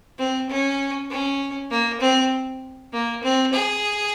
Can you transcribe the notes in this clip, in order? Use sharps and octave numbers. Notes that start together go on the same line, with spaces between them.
C4
C#4
C#4
A#3
C4
A#3
C4
G#4